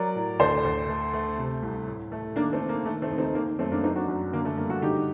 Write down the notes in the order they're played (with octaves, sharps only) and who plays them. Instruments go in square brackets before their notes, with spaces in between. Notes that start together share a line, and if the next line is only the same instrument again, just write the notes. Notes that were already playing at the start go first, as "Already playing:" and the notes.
Already playing: [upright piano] F#3 A#4 D5
A2
D2 A4 C5
D2
A3
A3
C3
C2
A2
A3
D#3 A#3 D4
A3 C4
D#3
A#3
D#3 A3
A3 C4
D#2
C4 D#4
D#3 A#3
F#2 A3 C4
A#3 D4
F#3 C4 D#4
D4 F#4
F#2
D3 A#3
A3
G2 A#3
F#4 A4
D3 D#4 G4